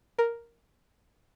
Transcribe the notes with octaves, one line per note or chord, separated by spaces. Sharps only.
A#4